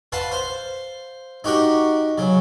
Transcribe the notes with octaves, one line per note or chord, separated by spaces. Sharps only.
B4 F5 F#5 A5 C6
C5 F5 C6
D#4 F#4 G4 A#4 F#5
C#3 F#3